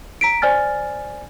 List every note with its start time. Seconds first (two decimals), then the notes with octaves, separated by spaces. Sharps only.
0.21 A#5 B6 D7
0.42 C5 D5 G#5 F6 A6